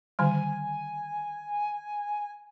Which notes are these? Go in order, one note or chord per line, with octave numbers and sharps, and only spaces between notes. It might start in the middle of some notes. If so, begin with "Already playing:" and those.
D3 D#3 G3 G#5